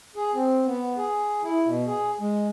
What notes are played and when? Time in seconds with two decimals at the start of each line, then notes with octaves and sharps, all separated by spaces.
0.16 G#4
0.33 C4
0.66 B3
0.97 G#4
1.43 E4
1.65 B2
1.87 G#4
2.19 G#3